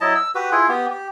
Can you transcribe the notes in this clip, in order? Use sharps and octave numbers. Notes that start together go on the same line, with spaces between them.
F#3 E4 D#5 A5
E6
F#4 G4 B4
E4 F4 G#4
B3 G4
G4